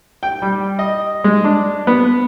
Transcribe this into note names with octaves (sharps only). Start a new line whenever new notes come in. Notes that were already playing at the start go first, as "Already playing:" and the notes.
G5
G3
D#5
G#3
D4
B3